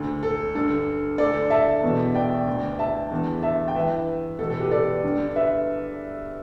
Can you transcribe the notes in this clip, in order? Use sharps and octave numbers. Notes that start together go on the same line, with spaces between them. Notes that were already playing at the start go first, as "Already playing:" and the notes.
Already playing: D2 D3 A4
A4
G2 D3 A4
D2 D3 A4 D5
E5 A5
E2 B2
D5 G5
D2 D3
E5 A5
E2 D3
E5 A5
G5
G2 E3 B4 E5
E2 B2 A4
A4
G4 B4
A4 D5
G2 D3
B4 E5